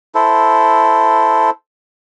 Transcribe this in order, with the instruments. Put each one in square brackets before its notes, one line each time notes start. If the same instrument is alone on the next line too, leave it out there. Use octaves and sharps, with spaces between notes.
[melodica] E4 A4 C5